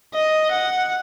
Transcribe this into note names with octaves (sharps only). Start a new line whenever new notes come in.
D#5
F#5